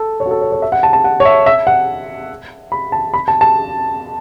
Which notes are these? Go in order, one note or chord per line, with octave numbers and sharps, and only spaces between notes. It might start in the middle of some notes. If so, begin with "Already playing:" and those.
Already playing: A4
C#5
F#4
A4
C#5
C#5
E5
F#5
A5
A5
F#5
C#5
E5
E5
F#5
B5
A5
B5
A5
A5